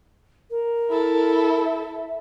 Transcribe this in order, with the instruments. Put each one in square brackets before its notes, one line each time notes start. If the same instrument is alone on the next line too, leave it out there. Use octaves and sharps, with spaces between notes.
[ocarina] A#4
[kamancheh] E4 A4
[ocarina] E5